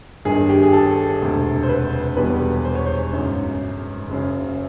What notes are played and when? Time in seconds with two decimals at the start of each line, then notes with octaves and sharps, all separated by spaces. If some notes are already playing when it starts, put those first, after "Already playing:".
0.25 G1 G2 D#3 G#4
0.49 G4
0.63 G#4
0.73 A4
1.21 E1 D2 C3
1.63 C5
1.69 B4
2.17 E2 B2 G3 B4
2.65 C5
2.75 C#5
2.86 C5
3.13 G#1 F#2 C#3
4.08 F#1 F#2 C#3